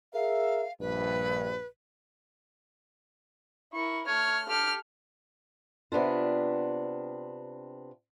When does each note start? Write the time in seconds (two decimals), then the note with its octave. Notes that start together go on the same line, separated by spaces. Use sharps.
0.13 G#4 A#4 E5 F5
0.80 A#1 G2 B4
3.73 E4 A#4 C#6
4.07 A3 C#5 F6
4.49 G4 A4 F6
5.92 C3 B3 D4 F4